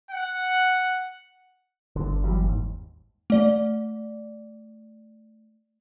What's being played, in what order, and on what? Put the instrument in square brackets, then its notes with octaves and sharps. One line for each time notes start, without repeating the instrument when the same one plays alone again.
[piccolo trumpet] F#5
[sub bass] G1 [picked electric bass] G2 D3
[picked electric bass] E3 F#3 G3
D#2 G#2
[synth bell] A3 D5